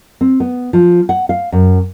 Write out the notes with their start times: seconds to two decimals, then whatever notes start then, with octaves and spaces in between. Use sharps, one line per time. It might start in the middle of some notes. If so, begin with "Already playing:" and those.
0.21 C4
0.40 B3
0.73 F3
1.09 F#5
1.29 F5
1.52 F#2